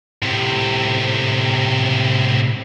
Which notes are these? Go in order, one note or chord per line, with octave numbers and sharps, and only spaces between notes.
A2 C3